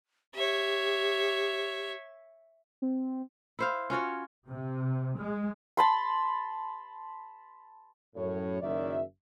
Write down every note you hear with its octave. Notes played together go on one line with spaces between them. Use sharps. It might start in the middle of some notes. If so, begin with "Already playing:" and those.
G4 C#5 E5
C4
E4 C5 F5
C#4 F4 F#4 C#5
C3
G#3
A5 B5 C6
F#2 A2 C#5
F#1 F#2 D#3 D5 E5